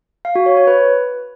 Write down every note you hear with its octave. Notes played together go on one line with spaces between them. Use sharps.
F5
F#4
C#5
C#5
B4